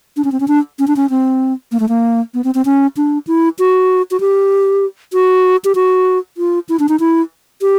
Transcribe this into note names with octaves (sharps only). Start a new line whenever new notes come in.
D4
C#4
C4
C#4
D4
C#4
D4
C#4
C4
A#3
A3
A#3
B3
C4
C4
C#4
D4
E4
F#4
F#4
G4
F#4
G4
F#4
F4
E4
D4
D#4
E4
G4